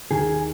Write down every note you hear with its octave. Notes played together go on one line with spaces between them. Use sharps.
D#2 D#3 G#4